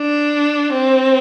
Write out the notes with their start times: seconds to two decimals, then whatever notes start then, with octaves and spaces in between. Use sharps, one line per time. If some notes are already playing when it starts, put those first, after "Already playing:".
Already playing: D4
0.72 C4